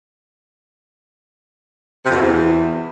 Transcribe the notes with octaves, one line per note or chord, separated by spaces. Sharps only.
C3
F2
B2
E2